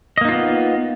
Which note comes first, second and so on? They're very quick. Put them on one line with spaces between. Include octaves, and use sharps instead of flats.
D#5 A#3 D#4 F4 B3